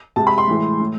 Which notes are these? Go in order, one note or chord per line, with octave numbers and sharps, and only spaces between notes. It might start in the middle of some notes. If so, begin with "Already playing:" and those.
C3 G#3 A5
B5
C6
A2 E3 G#3
A2